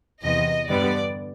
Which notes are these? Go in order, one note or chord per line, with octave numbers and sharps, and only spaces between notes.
E2 C3 E3 D#5
G2 D3 G3 B3 D5